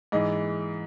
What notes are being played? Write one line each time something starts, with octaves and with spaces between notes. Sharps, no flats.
G#2 E3 D#5